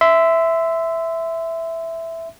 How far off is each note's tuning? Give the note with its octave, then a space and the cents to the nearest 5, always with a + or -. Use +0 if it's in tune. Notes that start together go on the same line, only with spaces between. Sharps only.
E5 +0 C6 -30